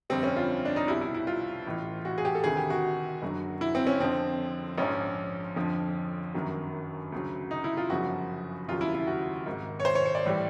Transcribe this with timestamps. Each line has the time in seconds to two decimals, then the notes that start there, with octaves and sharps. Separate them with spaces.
0.10 G1 F2 D3 G3 C4
0.23 C#4
0.36 F4
0.65 D4
0.76 D#4
0.87 C2 B2 G3 E4
1.01 E4
1.14 E4
1.27 F4
1.67 A1 A2 E3
2.05 F#4
2.18 G#4
2.25 G4
2.35 A4
2.44 D2 C3 D#3 G#4
2.57 G4
2.70 F#4
3.22 F#1 F#2 D3 F#3
3.61 E4
3.75 C4
3.87 C#4
4.00 F2 D3 F3 C4
4.78 A#1 G#2 F3 C#4
5.56 F2 D3 F3
6.34 G1 F#2 D#3 F#3
7.12 D2 C#3 F#3
7.51 D#4
7.64 E4
7.77 F4
7.90 G1 F#2 C#3 F3 F#4
8.69 F1 D#2 C#3 F#3 F4
8.81 E4
8.95 E4
9.07 F#4
9.46 G#1 G#2 D#3
9.80 C#5
9.85 C5
9.95 C#5
10.05 C#5
10.15 D5
10.25 A2 E3 G3